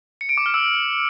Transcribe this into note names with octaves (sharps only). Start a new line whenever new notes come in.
C#7
D7
D6
F6
E6